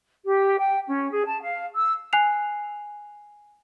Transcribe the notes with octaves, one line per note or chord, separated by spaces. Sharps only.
G4
G5
C#4
G#4
A5
F5
E6
G#5 F#6 C7 F7